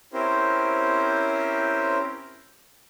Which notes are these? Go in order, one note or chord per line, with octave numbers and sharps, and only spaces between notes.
C4 C#4 E4 G4 A#4 C5